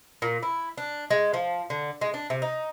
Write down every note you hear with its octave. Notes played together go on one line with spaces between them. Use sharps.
A#2
E4
D4
G#3
F3
D3
G#3
D4
C3
D#4